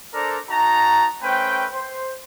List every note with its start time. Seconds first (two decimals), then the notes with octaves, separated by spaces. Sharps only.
0.14 D4 A4 A#4 C5 D5 A#5
0.50 D#4 F#4 A5 A#5
1.23 A3 C#4 B4 C5 G5
1.72 C5